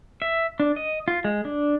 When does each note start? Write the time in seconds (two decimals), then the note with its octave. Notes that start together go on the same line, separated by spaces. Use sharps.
0.22 E5
0.60 D4
0.76 D#5
1.08 F4
1.24 G#3
1.45 D4